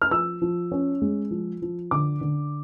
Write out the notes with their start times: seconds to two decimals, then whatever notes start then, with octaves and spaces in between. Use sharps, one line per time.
0.02 F6
0.11 F3 E6
0.42 F3
0.72 C#4
1.02 G#3
1.31 F3
1.62 F3
1.91 D3 D6
2.21 D3